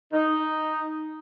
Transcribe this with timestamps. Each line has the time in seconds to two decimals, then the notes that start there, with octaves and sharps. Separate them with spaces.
0.12 D#4